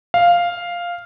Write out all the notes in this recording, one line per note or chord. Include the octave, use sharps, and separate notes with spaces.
F5